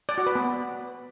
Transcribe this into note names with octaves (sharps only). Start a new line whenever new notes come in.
D5
F#4
B4
B3